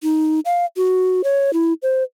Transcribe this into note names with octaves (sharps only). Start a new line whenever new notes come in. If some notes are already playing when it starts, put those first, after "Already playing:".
D#4
F5
F#4
C#5
E4
C5